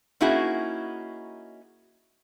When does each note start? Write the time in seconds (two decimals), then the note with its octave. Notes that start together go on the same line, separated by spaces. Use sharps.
0.21 A#3 C#4 D#4 E4 F#4 G#4